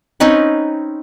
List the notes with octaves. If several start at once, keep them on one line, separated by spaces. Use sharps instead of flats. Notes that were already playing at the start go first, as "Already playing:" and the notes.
C4 C#4 D#4 B4